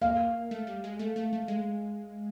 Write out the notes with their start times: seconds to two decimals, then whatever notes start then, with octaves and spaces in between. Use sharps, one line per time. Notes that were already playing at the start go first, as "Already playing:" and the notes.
0.01 A#3 F5
0.51 A3
0.67 G3
0.84 G#3
0.99 A3
1.16 A3
1.33 A3
1.48 G#3